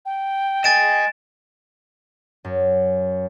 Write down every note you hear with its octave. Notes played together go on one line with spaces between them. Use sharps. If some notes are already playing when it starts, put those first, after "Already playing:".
G5
D#5 G#5 A6 D7 E7
F#2